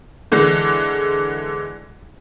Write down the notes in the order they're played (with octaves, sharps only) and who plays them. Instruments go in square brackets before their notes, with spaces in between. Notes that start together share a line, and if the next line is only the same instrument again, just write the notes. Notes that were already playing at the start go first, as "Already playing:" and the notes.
[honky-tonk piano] D3 E3 G#3